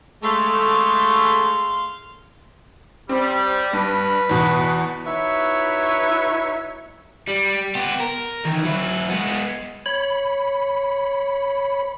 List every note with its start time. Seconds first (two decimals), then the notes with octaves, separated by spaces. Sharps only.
0.23 G#3 A3 F5 C6
3.09 G3 C4
3.73 G2 B4
4.29 E2 B2
5.05 D#4 E4 F#4 B4 C#5 E5
7.28 G3
7.75 B3 G4
8.00 A#4
8.45 D#3 E3
8.63 F#3 E4
9.10 G#3 B3
9.86 C#5 B5